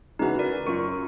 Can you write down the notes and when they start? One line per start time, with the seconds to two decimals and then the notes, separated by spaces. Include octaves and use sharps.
0.19 C#3 E3 D#4 F#4 B4
0.39 A#4 D5
0.66 F#2 F4 A#4 C#6